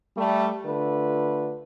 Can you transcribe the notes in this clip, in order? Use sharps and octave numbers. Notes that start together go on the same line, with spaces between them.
G3 A3
D3 A3 F4 B4